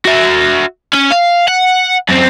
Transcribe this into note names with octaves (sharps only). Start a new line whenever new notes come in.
F#4 E5
C#4
F5
F#5
F#2 C4